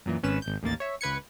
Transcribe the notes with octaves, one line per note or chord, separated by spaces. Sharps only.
F#2 A#2 E3
G#1 C#4 B4 E7
G#1 G6
A1 D#2 A#3 A6
C#5 E5
C#2 B4 G#6 C#7